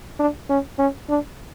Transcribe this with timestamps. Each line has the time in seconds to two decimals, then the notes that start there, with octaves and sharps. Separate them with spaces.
0.19 D4
0.49 C#4
0.79 C#4
1.09 D4